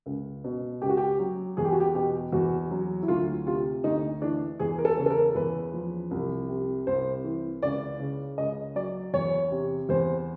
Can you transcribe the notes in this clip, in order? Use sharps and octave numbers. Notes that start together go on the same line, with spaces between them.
C#2
B2
C#2 G4
F#4
G4
F#3
E2 G#4
G4
F#4
G4
B2 G4
E2 F#4
F#3
E4
D2 F4
C3 F4
D2 D#4
E3 D4
E2 G#4
A#4
A4
C#3
A4
A#4
E2 B4
F3
C2
C3
C2 C5
E3
C#2 D5
C#3
C#2 D#5
F#3 D5
E2 C#5
C3
E2 C5